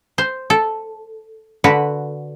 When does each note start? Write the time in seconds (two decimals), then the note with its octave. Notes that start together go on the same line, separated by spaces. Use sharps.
0.18 C5
0.50 A4
1.64 D3 F#4 B4